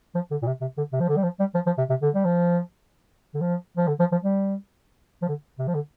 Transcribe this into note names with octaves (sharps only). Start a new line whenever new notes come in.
F3
D3
A#2
C3
C3
D3
C3
F3
D3
G3
F3
G3
F3
F3
C3
C3
D3
G3
F3
D3
F3
F3
D3
F3
F3
G3
F3
D3
C3
F3
D3